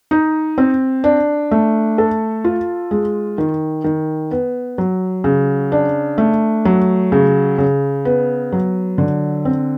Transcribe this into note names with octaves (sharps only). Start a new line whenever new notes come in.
D#4
C4
D4
A3
A4
F4
G#3
D#3
D#3
B3
F#3
C#3
D4
A3
F#3
C#3
C#3
B3
F#3
D3
C4